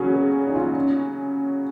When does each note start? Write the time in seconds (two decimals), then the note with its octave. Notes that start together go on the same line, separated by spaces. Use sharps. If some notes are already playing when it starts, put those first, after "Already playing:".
Already playing: C#3 F#3 C#4 F#4 G#4
0.14 G#4
0.47 D#4
0.55 F4
0.76 C#4